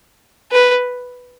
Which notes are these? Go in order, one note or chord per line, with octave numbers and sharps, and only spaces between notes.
B4